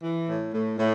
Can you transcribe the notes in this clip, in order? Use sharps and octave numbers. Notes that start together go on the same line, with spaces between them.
E3
A2
A2
A2